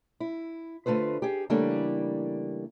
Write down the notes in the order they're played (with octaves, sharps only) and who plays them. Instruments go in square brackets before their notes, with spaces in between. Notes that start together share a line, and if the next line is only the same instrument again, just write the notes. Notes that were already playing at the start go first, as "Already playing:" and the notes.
[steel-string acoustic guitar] E4
D3 A3 F4 B4 C5
G4 G#4
C#3 E3 G3 A3 A#3 D4